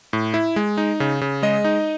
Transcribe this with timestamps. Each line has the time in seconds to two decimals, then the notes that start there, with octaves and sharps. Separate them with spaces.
0.13 A2
0.34 E4
0.56 G#3
0.77 D#4
1.00 C#3
1.21 C#3
1.43 G#3 D#5
1.64 D#4